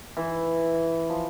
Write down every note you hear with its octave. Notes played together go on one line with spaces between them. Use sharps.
E3
F3